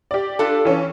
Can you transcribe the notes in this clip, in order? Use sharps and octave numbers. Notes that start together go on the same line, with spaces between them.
G4 D5
D4 F4 A4
E3 C#4